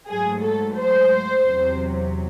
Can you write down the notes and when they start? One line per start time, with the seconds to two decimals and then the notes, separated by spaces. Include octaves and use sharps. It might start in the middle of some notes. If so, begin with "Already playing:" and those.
0.09 G#2 F#3 A3 G#4
0.43 A4
0.76 C5
1.43 E2 C3 F#3